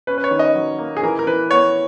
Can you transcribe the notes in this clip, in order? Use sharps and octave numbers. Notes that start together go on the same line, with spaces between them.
C#4 B4
B4
C#5
D#3
D#5
F#3
A#3
G#4
E3 A#4
A#4
E3 B4
B3 C#5